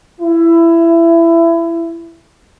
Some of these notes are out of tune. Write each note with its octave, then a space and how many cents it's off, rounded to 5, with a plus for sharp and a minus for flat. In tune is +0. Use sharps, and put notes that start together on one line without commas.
E4 +20